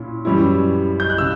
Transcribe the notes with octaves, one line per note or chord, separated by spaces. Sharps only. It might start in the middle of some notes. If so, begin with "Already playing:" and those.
Already playing: A#2 C#4 E4
F#2 E3 G3 C#4 E4
G6
F#6
C#3 E6